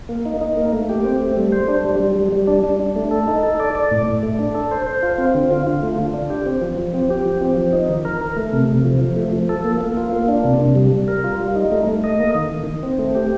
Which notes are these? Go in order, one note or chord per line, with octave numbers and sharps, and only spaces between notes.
A#3
D#4
D#4
A#3
A3
G4
C4
A3
G3
C5
D4
G3
G3
G3
G3
D4
D4
D4
A3
A4
D#4
A4
D5
D5
A2
A2
A3
D4
A4
C5
C5
F4
C4
D3
F4
F4
A3
D3
D4
G4
C4
F3
F3
C4
G4
F3
C4
F3
D#4
D#3
A#4
A#4
A3
C3
C3
F3
F3
A3
F3
A4
A#3
A#3
F4
A#3
D4
C3
C3
G3
G3
A#4
F4
G3
D#4
A3
A3
D#5
A#3
D#3
D#3
D#3
C4
A3
G4